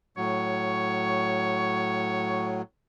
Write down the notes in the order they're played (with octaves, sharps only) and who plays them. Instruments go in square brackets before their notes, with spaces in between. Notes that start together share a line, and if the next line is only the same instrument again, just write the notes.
[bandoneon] A2 F#3 [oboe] C#5